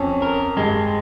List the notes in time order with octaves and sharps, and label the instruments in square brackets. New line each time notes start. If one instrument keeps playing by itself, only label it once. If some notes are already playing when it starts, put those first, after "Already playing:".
Already playing: [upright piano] F2 [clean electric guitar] C#4
[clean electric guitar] A#4
[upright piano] G2 [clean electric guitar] G#3